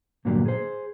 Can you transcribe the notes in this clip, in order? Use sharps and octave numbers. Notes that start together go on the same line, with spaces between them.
G2 A#2 D3 F#3 A#3 G4
G#4 C5